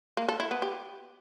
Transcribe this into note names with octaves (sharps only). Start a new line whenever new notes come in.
A#3
A4
E4
B3
G4